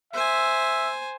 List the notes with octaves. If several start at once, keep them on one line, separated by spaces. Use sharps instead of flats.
C5 E5 G#5